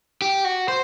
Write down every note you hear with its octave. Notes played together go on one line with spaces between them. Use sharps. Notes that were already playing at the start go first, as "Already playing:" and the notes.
G4
F#4
C5